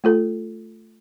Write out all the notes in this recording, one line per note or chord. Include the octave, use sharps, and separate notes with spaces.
A3 F4 A4